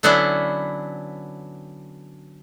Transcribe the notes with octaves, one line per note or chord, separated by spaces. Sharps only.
D3 F#3 B3 C#4 D4 E4